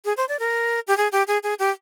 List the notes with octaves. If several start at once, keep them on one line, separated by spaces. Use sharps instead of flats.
G#4
C5
D5
A#4
G4
G#4
G4
G#4
G#4
G4